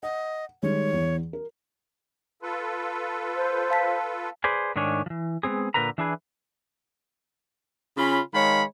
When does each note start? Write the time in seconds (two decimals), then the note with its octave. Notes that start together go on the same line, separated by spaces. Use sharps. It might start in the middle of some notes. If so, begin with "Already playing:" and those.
0.03 D#5 F#5
0.63 D#3 G3 G#3 C#5
0.93 E2 E3
1.33 A#4
2.42 F4 A4 B4
3.35 C5
3.70 F5 A5 B6
4.44 G#4 B4 C5 D5 G#5
4.76 G#2 D#3 A3 D4 C#5 G#5
5.06 E3 F3
5.43 G#3 B3 C4 G#4
5.74 A#2 D3 A#4 B4 A#5
5.98 E3 D4 E4 G#4 B4
7.97 C#3 C#4 F4 B5
8.34 D#3 G#3 C#5 F5 B5